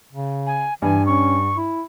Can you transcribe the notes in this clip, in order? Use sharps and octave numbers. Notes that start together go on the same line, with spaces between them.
C#3
G#5
G2 E3 G#5
C#4 C#6
E4